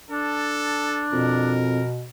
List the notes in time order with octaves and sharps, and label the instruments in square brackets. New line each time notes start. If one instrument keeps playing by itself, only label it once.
[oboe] D4 [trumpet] A4
[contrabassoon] F2 [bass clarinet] B2 [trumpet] A#4